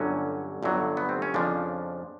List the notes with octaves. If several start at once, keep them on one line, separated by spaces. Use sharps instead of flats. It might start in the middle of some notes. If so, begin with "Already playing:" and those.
Already playing: G1 G2 D3 F#3 C#4
G1 G2 D3 F#3
B3
C4
C#4
F2 C#3 F3 D4